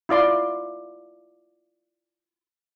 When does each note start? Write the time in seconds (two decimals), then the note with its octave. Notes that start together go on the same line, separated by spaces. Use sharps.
0.09 E4 F4 D5 C6